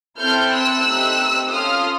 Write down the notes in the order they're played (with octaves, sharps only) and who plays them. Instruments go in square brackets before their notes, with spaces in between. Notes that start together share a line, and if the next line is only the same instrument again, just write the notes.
[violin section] C4 E4 A4 F6 G6
E6 F#6
A3 C4 D#4 G4
C#4 F4 A4 D#6 F6